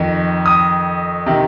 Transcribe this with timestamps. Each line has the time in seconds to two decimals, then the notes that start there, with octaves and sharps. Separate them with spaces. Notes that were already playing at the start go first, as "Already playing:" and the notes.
Already playing: F2 D#3
0.46 D#6
1.26 C3 D#3